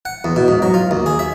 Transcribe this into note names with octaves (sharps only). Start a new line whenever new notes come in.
F#5
E2
B2
G#2
F#3
F4
D#2
G#4
E5